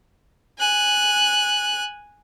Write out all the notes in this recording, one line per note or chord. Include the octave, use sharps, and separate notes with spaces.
G#5 F#6